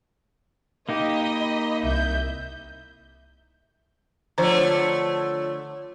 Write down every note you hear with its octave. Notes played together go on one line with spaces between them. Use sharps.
A#3 D#4 G4 D#5 B5
C2 E5 G6
D3 F3 A3 F4 C5 C#5 A#5